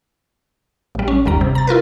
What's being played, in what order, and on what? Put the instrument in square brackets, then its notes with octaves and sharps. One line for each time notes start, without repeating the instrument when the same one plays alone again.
[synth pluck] A1 G3
C#4
G1 D#2 G3 A#5
C3
A#5 A6
E4 F4 A#4 B4